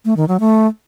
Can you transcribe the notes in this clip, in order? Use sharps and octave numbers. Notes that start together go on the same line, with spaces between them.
A3
D#3
F#3
A3